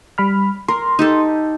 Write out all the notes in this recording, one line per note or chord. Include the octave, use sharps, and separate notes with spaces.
G3 B5 F6
A#4 C6
D#4 G4 A4